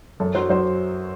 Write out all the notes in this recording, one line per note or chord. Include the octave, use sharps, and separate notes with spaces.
F#2 A4
F#3 C5
F#3 C5